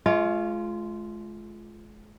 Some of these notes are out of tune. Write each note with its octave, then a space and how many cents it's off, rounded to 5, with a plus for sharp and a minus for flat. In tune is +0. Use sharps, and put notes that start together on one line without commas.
G#3 +40 F4 -10 C#5 +35